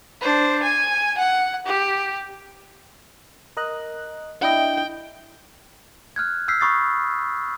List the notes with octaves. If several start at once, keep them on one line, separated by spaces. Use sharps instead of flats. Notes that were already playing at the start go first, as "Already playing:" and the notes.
D4 C5
G#5
F#5
G4
A#4 D#5 F#6
D4 E4 D#5 G5
F6 F#6 G#6
E6 F6 G6 B6 C7
B5 C#6 D#6 A6 C7